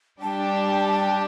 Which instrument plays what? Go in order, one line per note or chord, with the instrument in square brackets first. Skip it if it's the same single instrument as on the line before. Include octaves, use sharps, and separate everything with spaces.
[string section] G3 D4 G4 [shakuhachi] A5